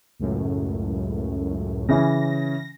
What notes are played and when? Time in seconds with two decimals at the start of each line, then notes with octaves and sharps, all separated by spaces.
0.19 C#2 F#2 A2
1.89 C#3 E3 C#4 A#6